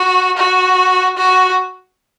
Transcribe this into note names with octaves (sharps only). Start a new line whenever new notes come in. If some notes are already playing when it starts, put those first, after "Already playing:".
Already playing: F#4
F#4
F#4